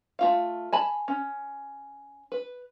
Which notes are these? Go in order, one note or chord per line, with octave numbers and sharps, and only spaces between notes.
A3 F4 F5
G#5 A5 B5
C#4
B4